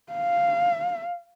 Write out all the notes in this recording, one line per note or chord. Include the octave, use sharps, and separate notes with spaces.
F5